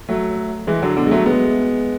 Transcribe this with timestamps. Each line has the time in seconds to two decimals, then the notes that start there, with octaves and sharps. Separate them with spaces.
0.09 F#3 A3
0.67 E3 G#3
0.82 D3 F#3
0.97 B2 D3
1.07 G#3
1.11 F#3 A3
1.26 G#3 B3